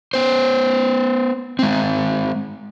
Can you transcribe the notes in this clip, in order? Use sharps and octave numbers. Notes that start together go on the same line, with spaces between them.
B3 C5
G#3 C4